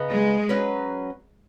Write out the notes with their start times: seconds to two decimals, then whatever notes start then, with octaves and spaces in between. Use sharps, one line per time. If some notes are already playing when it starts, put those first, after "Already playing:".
Already playing: C#3 B3 D#4
0.12 G#3
0.49 F#3 C#4 B4